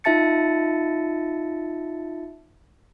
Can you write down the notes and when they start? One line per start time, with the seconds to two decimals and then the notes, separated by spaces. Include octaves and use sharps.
0.04 D#4 F4 E5 A5 A6 C#7